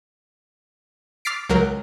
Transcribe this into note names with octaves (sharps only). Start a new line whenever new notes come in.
D6 F6 A6 B6 C7 D7
C#2 F#3 A#4